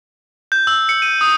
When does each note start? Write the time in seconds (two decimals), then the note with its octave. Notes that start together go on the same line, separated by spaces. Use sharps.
0.52 G6
0.67 E6
0.89 C#7
1.02 D#7
1.21 D#6